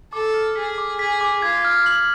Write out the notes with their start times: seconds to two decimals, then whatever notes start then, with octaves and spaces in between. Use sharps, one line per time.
0.12 A4 D6
0.34 F6
0.56 G#4 B6
0.78 D6
0.99 G#4 B6
1.21 D6
1.42 F4 G#6
1.64 F6
1.86 F#7